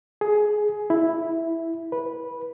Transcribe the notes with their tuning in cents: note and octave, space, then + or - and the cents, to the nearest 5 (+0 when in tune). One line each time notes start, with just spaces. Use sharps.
G#4 +15
E4 +0
B4 -15